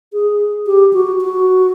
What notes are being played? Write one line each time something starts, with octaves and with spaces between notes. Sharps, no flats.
G#4
G4
F#4
F#4